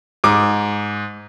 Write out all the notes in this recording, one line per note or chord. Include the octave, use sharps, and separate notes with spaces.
G#2 D6